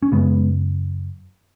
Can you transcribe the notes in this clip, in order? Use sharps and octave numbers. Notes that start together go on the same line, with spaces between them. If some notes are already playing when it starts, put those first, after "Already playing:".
C#4
F#2 C#3 G#3 B3